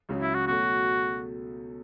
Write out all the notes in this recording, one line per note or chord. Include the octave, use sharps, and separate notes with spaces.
C#2 C#3 F#3 C#4
E4
F#4
B2 F#3 A3 F#4